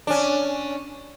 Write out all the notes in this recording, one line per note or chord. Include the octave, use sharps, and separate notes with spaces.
C#4 D4